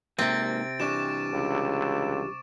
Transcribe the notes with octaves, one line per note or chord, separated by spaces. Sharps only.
G#2 C3 D#3 A#3 C4 A6 D7
E3 G3 D4 C#6 D6 E7
C#2